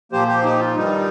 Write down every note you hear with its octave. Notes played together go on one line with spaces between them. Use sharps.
A#2 F3 A#3 G4 C5
G4 C5
D#4 G4
F4
G2 D#3 G3 D#4